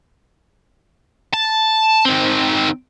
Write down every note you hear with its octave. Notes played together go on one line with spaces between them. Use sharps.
A5
D#3 C4